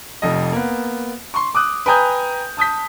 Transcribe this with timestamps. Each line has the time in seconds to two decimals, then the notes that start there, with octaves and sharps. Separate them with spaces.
0.22 F1 F2 D#5
0.52 A#3 B3
1.34 C6 C#6
1.55 D6 D#6 F#6
1.86 B4 G5 G#5 A#5 D#6 G6
2.57 A5 D#6 G6 B6